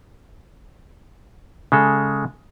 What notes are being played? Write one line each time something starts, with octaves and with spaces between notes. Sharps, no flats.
C#3 G#3 A4